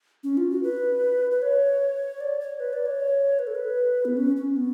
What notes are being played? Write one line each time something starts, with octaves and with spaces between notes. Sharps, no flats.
C#4
F4
F#4
B4
B4
C#5
D5
C#5
B4
D5
C#5
B4
A4
B4
B3
C#4
C#4
B3